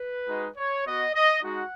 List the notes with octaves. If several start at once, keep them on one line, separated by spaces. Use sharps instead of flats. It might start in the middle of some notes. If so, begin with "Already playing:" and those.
Already playing: B4
G#3 D#4 F#4
C#5
B3 F#4 D#5
D#5
G#3 D#4 F#4 F#5